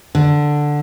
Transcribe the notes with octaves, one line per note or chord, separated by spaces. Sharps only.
D3